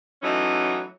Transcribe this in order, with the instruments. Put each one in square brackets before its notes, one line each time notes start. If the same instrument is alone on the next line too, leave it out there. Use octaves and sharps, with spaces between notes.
[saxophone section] E3 F#3 A3 C#4 D#4